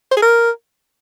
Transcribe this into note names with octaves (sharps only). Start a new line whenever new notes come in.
C5
G#4
A#4